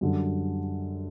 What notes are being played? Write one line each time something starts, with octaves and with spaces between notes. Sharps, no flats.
F#2 D3 G3